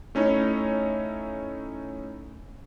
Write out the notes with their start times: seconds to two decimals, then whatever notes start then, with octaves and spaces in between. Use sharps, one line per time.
0.15 A3 C#4 D#4 E4 C#5